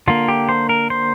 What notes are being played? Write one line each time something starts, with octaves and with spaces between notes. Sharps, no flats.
D3 A#3 F4
G4
C5
A#4
C5